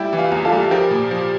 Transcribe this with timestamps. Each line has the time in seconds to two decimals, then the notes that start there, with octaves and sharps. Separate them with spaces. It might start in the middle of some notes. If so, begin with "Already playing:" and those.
Already playing: G3 E4 G4
0.13 E3
0.19 F4
0.32 E2
0.45 F4 A4
0.52 G3
0.71 F3 G4 A#4
0.91 A#2
1.11 F3